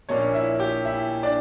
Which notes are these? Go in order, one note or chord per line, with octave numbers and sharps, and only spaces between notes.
A#1 A#2 A#3 C#4 D4 C#5
E4 E5
G4 G5
E4 E5
D4 D5